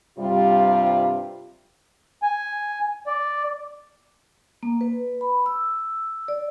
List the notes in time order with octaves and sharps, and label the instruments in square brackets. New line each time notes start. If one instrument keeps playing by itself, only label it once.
[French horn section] G2 C3 G3 F4
[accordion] G#5
D5
[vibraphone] A#3
B4
B5
E6
D5